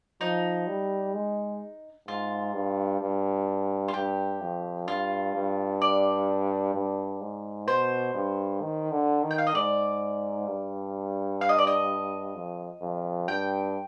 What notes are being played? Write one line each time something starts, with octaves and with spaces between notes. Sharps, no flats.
F3 D#4
G3
G#3
G#2 F4
G2
G2
F4
G2 G4
F2
G2 F4
G2
D5
G2
G#2
B2 C5
G2
D#3
D3
D#3
G5
F5
D#5
G#2 D5
G2
F5
D#5
D5
D#5
F2
F2
G2 G5